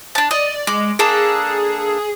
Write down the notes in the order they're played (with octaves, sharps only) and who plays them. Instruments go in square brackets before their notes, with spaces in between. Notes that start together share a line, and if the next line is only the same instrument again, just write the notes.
[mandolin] D4 A5
[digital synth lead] D5 [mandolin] D#5
[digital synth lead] G#3 [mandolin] D5
[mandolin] A#3 D4 A4 [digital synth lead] G#4